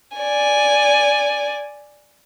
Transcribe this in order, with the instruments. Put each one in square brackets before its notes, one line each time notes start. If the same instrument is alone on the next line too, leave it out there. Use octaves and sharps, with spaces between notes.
[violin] D5 G#5